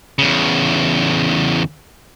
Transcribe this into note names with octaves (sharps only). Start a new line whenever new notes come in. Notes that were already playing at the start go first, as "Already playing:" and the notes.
E2 C#3